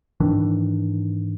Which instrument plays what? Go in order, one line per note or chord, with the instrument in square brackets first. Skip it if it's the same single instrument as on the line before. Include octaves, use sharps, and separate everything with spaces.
[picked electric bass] G#2 D#3 E3 D4